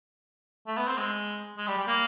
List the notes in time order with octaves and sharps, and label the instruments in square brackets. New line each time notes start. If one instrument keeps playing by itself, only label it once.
[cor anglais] A3
B3
C4
G#3
G#3
G3
G3
A#3